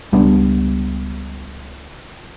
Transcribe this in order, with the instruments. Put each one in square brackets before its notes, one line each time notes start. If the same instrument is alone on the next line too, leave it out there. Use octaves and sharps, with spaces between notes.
[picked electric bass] C#2 G3 B3 D4